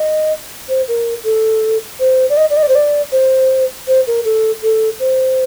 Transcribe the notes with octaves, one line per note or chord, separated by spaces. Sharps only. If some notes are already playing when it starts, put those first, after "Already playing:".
Already playing: D#5
C5
A#4
A4
C5
D5
D#5
D5
D#5
D5
C5
D5
C5
C5
A#4
A4
A4
C5